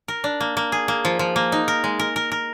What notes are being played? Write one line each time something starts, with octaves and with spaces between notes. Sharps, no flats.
A#4
D4
A#3
A#3
G#4
A#3
F3
F3
A#3
D#4
A#4
G#3
A#4
A#4
A#4